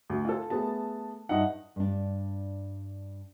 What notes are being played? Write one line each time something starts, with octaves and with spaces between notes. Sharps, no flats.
D2
F4 A4
A3 B3 G#4 A5
G2 D#4 E5 F#5
G2 D4